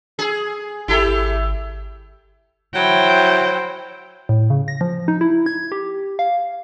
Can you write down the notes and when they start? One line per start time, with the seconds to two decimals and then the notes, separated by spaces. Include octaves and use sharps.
0.19 G#4
0.88 G#1 E4 G4 A4
1.08 G#1
2.75 F#3 E4 C5 G5
4.29 A2
4.50 C#3
4.68 A#6
4.81 F3
5.08 D#4
5.21 E4
5.46 G#6
5.72 G4
6.19 F5